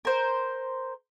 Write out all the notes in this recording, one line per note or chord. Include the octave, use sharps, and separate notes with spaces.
A#4 C5